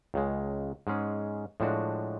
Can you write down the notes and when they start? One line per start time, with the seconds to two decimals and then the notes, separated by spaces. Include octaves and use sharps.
0.14 C#2 C#3 G#3
0.87 G#2 G#3 C#4 G#4
1.60 A2 F3 G#3 D4 F#4